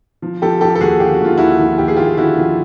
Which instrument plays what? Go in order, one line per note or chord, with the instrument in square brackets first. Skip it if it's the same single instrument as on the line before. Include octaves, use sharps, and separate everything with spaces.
[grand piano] F3
F3 G4 A4
F3 G4 A4
A4
D#2 F#4 G#4
D3 G4
F#4
D#2 F4
D#2 E4 F#4
F3
D#2 G4
G#4
D#2 F4 G4
D3 E4 F#4
F3